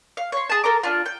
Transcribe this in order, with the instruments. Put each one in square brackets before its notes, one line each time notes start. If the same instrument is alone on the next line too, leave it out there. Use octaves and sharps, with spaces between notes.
[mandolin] F5
C#5 C6
G#4 A5
A4 A#4 A#5 D6
D4 F4
G5